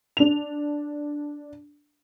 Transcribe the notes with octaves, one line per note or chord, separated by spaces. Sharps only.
D4 F7